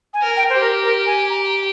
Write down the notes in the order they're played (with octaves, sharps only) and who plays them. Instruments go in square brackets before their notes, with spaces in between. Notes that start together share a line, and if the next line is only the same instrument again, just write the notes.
[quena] G#5
[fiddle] A#4
[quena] G5
[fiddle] G4 [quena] C5
[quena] A#4
A#4
G#5
A#5